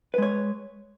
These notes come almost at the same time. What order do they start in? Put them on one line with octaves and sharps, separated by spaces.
B4 G#3 C#5